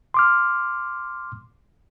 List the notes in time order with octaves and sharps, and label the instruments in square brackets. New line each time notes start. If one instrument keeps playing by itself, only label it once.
[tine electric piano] C6 D6 F6